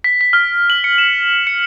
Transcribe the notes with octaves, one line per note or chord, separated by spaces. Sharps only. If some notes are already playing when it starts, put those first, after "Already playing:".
B6
B6
F6
F#7
C#7
E7
C#7